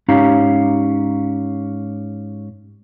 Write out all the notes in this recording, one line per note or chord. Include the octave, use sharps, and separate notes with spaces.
G#2 C#4 D#4 G4 F5 A#5